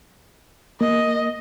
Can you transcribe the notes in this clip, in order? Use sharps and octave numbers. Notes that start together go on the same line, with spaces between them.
A#3 D#5